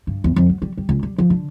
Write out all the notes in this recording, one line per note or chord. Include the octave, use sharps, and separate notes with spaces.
G2
E2
F2
F#3
G3
G3
C#2
G3
F3
D3